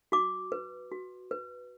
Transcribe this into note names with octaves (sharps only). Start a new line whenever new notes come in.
F#4 D6
B4
F#4
B4